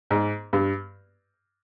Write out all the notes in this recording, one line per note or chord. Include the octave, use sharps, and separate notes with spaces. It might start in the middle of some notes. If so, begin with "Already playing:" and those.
G#2
G2